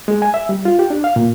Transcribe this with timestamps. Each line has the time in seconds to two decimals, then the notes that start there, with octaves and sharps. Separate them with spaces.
0.08 G#3
0.22 G#5
0.34 E5
0.49 G3
0.65 F4
0.79 G4
0.90 D4
1.04 F5
1.16 A#2